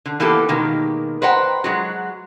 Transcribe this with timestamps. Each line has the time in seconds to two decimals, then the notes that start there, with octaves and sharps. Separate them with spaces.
0.06 D3
0.20 E3 A#3 B3 G4 A4
0.49 B2 D#3 G#3 A#3
1.22 B4 C5 D#5 F#5 G5 A#5
1.64 F#3 G#3 F#4